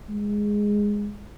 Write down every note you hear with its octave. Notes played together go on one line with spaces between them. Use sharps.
G#3